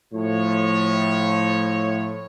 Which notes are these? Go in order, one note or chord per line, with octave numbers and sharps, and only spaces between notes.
A2 F3 C#5